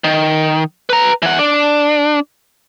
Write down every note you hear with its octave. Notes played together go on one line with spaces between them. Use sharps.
D#3
B4 A#5
E3 F#5
D4